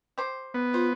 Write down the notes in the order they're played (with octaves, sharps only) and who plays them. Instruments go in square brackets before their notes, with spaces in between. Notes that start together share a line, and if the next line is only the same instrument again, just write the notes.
[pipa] G4 C5
[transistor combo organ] B3
[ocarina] F4 [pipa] C5